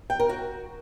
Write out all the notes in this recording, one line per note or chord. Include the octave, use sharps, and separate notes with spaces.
G5
A#4
F#4